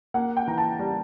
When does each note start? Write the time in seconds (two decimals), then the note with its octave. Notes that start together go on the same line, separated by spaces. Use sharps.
0.14 A#3 F#5
0.37 G5
0.48 E3 A#5
0.58 A5
0.79 G3